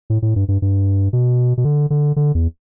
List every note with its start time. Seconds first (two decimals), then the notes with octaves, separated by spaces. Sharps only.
0.10 A2
0.22 A2
0.36 G2
0.48 G2
0.62 G2
1.13 B2
1.57 B2
1.65 D3
1.90 D3
2.16 D3
2.35 E2